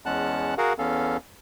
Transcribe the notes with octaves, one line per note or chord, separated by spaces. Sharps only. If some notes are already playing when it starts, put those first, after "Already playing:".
E2 G#3 C#4 F#5 A5 F#6
F#4 G#4 A#4 F5 F#5
E2 B3 C#4 A4 F5